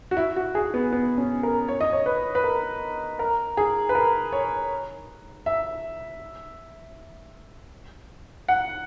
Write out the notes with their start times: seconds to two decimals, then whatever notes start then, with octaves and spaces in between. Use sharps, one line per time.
0.11 F#4
0.17 E4
0.36 F#4
0.55 G#4
0.74 B3
0.93 B3
1.18 C#4
1.43 A#4
1.68 C#5
1.80 D#5
1.93 C#5
2.06 B4
2.35 B4
2.44 A#4
3.19 A#4
3.57 G#4
3.89 B4
3.95 A#4
4.32 C#5
5.46 E5
8.48 F#5